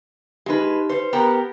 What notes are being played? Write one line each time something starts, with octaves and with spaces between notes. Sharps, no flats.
G#3 D#4 G4 B4
B4 C5
B3 G4 A#4